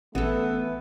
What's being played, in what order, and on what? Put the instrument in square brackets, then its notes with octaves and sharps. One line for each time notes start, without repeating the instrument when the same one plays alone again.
[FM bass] A1 [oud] E3 A4 [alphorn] A3 [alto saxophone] B3